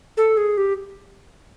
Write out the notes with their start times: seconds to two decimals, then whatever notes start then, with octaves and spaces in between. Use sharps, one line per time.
0.17 A4
0.37 G#4
0.57 G4